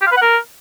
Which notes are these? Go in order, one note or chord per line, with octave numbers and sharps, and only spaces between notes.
G4
F5
B4
F#5
A#4